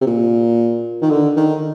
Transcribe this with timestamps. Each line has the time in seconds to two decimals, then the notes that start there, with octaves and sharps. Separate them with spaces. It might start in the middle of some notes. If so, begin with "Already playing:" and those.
0.01 C3
0.07 A#2
1.02 D#3
1.10 D3
1.37 D#3